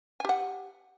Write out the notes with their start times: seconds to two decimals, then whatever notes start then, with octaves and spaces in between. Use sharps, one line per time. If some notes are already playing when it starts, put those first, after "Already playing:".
0.20 G#5
0.25 G4
0.29 F#5